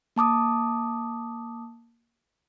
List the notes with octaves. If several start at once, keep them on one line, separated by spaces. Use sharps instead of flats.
A#3 A5 D6 D#6